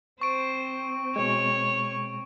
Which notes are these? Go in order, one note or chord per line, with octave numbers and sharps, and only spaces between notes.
C4 C5 C#6 D7
B2 G#3 C#5